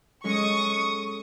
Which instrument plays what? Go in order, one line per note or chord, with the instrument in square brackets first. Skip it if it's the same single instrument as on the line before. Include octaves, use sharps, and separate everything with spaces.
[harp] G#3 C#4 A4 [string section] C#6 D#6